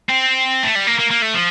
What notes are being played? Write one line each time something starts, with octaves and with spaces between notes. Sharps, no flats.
C4
A3
G3
A#3
A#3
A#3
A3
F3